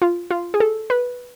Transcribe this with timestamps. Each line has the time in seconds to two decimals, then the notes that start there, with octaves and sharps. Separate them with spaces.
0.02 F4
0.31 F4
0.54 G#4
0.60 A4
0.90 B4